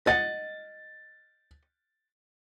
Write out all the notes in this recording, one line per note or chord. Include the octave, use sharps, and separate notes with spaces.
D#5 F#5 A6